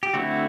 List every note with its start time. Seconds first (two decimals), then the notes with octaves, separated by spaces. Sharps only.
0.03 G4
0.14 D3 A3 C4 E4 F#4